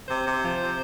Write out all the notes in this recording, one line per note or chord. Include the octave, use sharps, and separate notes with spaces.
C3 C5
C3
F3
C3